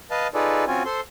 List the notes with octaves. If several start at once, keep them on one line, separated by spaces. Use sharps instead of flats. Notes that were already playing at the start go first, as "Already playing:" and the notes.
B4 D#5 F5 A5
D#4 F4 G#4 A4 B4 D5
C4 C#4 F4 F#4 G#5
A4 C5 C6